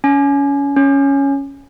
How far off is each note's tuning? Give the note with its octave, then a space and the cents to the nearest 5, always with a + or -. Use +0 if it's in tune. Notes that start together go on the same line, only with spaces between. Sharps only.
C#4 +25
C#4 +0